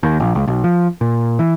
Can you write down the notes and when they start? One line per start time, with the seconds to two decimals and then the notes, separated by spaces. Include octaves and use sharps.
0.03 D#2
0.20 A#1
0.35 C#2
0.47 B1
0.64 F3
1.01 A#2
1.39 E3